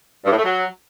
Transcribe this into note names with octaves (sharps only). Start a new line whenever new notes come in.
G2
A2
A3
F#3